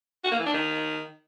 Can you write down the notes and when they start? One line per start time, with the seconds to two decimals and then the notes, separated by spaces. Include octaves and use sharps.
0.24 F#4
0.31 A#3
0.39 E3
0.46 D4
0.54 D#3